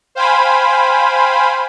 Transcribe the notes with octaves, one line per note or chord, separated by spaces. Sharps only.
C5 F5 G5 G#5 B5